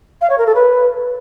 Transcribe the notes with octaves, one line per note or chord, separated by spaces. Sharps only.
F5
C#5
A#4
A4
B4